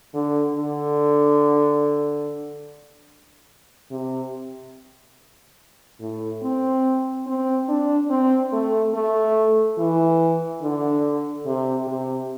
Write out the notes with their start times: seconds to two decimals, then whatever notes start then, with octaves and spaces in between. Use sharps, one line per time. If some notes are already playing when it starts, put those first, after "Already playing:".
0.14 D3
0.56 D3
3.91 C3
6.00 A2
6.43 C4
7.27 C4
7.68 D4
8.10 C4
8.53 A3
8.94 A3
9.78 E3
10.62 D3
11.46 C3
11.87 C3